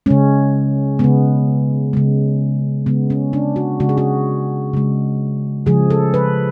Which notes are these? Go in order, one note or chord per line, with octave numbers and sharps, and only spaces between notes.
C#3 G#3 C#4
C#3 G#3 B3
C#3 G#3
C#3 G#3 B3
C#4
D4
F#4
C#3 G#3 F#4
G#4
F#4
C#3 G#3
C#3 F3 G#3 G#4
A4
B4